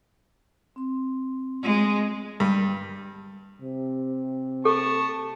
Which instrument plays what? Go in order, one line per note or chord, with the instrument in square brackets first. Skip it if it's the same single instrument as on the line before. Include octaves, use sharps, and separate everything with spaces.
[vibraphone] C4 C6
[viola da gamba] G#3
[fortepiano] G2
[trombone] C3
[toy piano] A4 [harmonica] A5 C#6